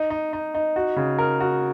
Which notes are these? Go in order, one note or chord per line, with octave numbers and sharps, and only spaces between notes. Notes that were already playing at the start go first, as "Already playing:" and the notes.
Already playing: D#4
D#4
D#4
D#4
F#4
C#3
A#4
F#4